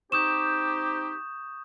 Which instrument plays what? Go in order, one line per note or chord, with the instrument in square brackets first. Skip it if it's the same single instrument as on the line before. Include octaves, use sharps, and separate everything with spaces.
[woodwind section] C4 D#4 G4 [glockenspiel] C#6 D#6 G6 [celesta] E7